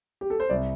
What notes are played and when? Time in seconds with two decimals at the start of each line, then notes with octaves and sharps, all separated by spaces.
0.21 G4
0.30 A4
0.40 C5
0.49 C2 D5